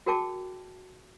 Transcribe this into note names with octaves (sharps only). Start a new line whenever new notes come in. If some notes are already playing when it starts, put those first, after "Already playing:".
F#4 G#4 A#4 G5 A5 D6